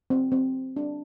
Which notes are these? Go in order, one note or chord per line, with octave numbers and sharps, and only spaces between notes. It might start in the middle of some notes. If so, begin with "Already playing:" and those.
C4
C4
D4